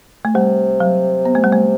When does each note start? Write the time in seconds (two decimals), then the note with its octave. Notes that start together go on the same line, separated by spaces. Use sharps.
0.25 A3
0.35 C3 G3
0.80 F#3
1.25 B3
1.35 A3
1.44 G3
1.53 A3